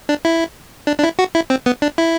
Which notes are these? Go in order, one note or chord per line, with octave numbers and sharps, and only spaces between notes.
D4
E4
D4
D4
E4
F#4
E4
C4
B3
D4
E4